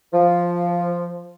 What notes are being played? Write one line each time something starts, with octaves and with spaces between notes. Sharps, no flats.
F3